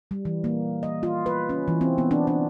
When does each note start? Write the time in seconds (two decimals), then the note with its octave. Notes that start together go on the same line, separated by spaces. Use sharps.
0.11 G3
0.25 E3
0.44 A#3
0.83 D#5
1.03 F4
1.26 B4
1.50 C#4
1.68 E3
1.81 C4
1.98 B3
2.11 D4
2.27 D4